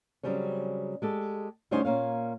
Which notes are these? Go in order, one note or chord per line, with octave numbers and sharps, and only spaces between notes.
C#3 F#3 G3 C4 C#4
G#3 G4 A4
D2 G3 C#4 D#4 C5 G#5
A#2 A#3 C#4 F5